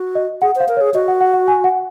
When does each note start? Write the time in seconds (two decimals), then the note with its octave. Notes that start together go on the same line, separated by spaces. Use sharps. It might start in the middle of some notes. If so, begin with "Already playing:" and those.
Already playing: F#4
0.15 D#5
0.42 G#4 F#5
0.56 C5
0.60 F5
0.69 A#4
0.77 G#4 C#5
0.94 F#4 D#5
1.08 F#5
1.21 F#5
1.33 F#5
1.48 G#5
1.64 F#5